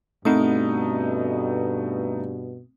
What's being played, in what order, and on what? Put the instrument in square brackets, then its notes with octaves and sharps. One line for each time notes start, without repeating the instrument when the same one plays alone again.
[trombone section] G2 B2 [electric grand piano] A3 D#4 [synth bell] C4 D#6